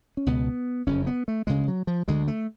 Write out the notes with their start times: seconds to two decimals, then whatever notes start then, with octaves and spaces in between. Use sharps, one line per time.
0.17 C#4
0.26 C#2 B2 B3
0.87 F#1 F2 C#3 C#4
1.07 B3
1.28 A3
1.47 D2 C#3 G#3
1.68 F#3
1.87 F3
2.08 D2 D3 G#3
2.28 A3